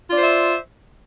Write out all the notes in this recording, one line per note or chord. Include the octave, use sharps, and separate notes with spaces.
F4 C5 D5 E5